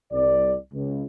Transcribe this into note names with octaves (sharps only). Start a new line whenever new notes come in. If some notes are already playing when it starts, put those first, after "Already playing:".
C2 D5
C#2